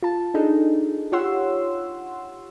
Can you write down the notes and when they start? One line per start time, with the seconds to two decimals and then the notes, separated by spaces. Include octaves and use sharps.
0.02 F4 A5
0.34 D4 D#4 G#4 A4
1.12 F4 G4 C#5 F#5 C6 E6